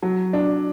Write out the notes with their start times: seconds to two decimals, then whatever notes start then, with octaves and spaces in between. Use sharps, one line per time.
0.02 F#3
0.33 D4